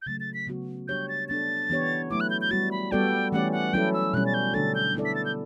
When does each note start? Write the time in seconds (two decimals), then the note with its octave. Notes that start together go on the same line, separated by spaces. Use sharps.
0.02 G6
0.06 C#3 F#3 A3 A6
0.20 A6
0.34 B6
0.47 C#3 F#3 B3 F#4
0.88 G3 D4 G4 C#5 G6
1.09 A6
1.29 B3 D4 A4 A6
1.70 E3 B3 D4 G4 C#5
2.11 F#3 A3 E4 D6
2.20 F#6
2.30 G6
2.41 G6
2.51 G3 B3 F#4 A6
2.71 B5
2.91 G3 B3 F#4 A4 D5 G5
3.32 E3 A3 C#4 G4 D5 F#5
3.52 F#5
3.73 F#3 C#4 E4 A4 G5
3.93 E6
4.13 B2 G3 C#4 F#6
4.26 A6
4.34 G6
4.54 D3 A3 D4 A4 A6
4.75 G6
4.94 B3 E4 A4 D5
5.05 B6
5.15 A6
5.25 G6